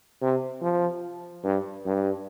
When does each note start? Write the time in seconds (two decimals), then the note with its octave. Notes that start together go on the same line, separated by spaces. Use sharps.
0.22 C3
0.62 F3
1.44 G2
1.86 G2